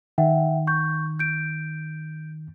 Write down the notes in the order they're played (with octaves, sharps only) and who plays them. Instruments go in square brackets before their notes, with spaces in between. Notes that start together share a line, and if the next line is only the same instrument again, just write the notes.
[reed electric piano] D#3 [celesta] E5 F#5 G5
[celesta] C#6 G6
G6 D7